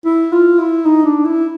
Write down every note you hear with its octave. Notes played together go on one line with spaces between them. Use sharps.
E4
F4
E4
D#4
D4
E4